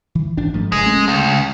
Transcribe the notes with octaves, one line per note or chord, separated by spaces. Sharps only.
E3
G#1 D4
G#2 F3 A3
F1 G#3
A3 C#4
C#2